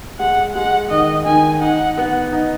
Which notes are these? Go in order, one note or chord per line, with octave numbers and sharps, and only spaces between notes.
G#3 F#5
G#3 F#5
D#3 D#5
D#3 G#5
D#4 F#5
B3
D#4